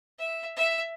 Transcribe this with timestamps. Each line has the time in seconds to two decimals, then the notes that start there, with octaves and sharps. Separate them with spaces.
0.19 E5
0.57 E5